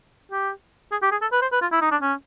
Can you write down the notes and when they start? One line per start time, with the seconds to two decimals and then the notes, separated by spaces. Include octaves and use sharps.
0.32 G4
0.92 G#4
1.02 G4
1.12 G#4
1.22 A4
1.32 B4
1.42 C5
1.52 B4
1.62 F4
1.72 E4
1.82 D#4
1.92 D4
2.02 C#4